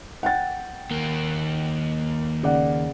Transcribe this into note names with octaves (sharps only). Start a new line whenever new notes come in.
F#5 G5 A6
D#2 A#3
C#3 D5 F#5